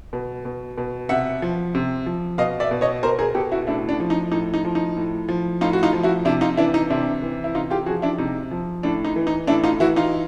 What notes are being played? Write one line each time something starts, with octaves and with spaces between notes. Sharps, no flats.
B2
B2
B2
C3 E5 F#5
F3
C3
F3
B2 D#5 F5
D5 E5
B2
C#5 D#5
B2 A#4 C5
G#4 A#4
B2 G4 A4
E4 F#4
A2 D4 E4
D4
F3
D#4
A2 D#4
D#4
F3
D#4
A2
F3
A2 D#4 F4
F#4
D#4 F4
F3
E4 F#4
C3 D4 E4
D#4 F4
E3 D4 E4
D#4
C3 D4 E4
E3
E4
C3 D#4 F4
F4 G4
F3 F#4 G#4
D4 E4
C3 D#4
F3
A2 D4
D#4
E3
D#4
A2 D4 E4
D#4 F4
E3 E4 F#4
D#4 F4